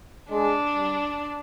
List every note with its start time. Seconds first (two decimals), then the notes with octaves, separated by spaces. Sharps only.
0.30 G#3 D4
0.76 G3